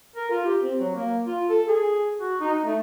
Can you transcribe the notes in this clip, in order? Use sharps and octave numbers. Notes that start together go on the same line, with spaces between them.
A#4
F4
G4
C4
F#3
A#3
F4
A4
G#4
F#4
D#4
A3